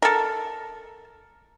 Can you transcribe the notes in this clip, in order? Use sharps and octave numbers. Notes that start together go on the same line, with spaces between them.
A4 A#4